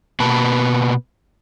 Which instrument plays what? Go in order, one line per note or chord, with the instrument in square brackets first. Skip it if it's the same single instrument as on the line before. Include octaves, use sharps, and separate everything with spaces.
[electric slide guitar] B2 A#3 B3 B4 A5